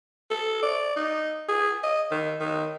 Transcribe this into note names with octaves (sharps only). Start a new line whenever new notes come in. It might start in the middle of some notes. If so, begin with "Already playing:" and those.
A4
D5
D#4
G#4
D#5
D#3
D#3